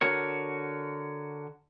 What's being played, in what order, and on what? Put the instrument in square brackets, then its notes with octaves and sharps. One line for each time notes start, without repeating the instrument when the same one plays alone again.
[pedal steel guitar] D3 F#4 A#4 C#5